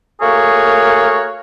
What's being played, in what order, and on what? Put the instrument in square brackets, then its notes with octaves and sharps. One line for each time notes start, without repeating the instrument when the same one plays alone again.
[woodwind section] A3 A#3 F#4 G#4 A#4 C#5